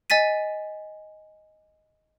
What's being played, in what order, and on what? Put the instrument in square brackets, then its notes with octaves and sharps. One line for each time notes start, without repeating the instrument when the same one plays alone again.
[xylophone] D#5 G#5 A6 B6 D#7